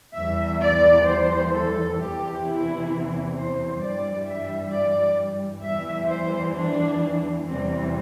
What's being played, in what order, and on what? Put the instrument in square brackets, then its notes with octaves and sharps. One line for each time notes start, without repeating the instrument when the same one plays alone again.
[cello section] E2 E3 G3 E5
D5
C5
A4
E2 C3 E3 G4
E4
C5
G2 E3 G3 D5
E5
D5
E2 E3 G3 E5
C5
D4
E2 C3 E3 G3 C4